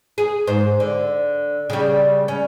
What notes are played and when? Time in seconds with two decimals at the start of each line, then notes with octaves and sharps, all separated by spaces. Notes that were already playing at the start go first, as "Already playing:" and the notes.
0.18 G#4
0.47 G#2 C5
0.80 D3
1.70 C#3 G3
2.28 C#4